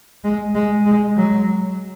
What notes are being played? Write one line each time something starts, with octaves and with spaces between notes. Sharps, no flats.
G#3
G#3
G#3
F#3